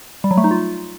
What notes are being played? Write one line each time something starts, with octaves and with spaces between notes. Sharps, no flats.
G3
F#3
A3
D#4
F4